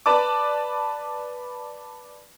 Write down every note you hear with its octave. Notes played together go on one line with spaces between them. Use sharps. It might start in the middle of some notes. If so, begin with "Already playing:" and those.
B4 D5 A5 D6